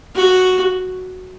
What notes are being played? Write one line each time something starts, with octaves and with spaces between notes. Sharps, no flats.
F#4